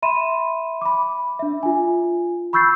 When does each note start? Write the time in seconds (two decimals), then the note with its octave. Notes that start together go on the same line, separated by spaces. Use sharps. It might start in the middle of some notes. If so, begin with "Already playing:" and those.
0.03 E5 B5 C6 D#7 E7
0.81 B5 D6
1.39 D4 E5
1.63 F4 G#5
2.53 B5 C#6 E6 G6 A6 C7